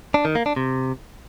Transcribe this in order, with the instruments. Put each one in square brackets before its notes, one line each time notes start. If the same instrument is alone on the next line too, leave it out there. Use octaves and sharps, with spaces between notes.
[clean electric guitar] D4
D#3
A#3
D4
C3